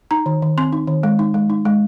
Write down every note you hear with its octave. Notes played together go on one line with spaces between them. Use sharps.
D#4 A#5
D#3
D#3
C4 C6
D#4
D#3
G#3
D#4
G#3
D#4
G#3